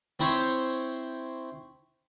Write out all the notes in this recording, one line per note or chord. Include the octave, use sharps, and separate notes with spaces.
C4 E4 C5 C#5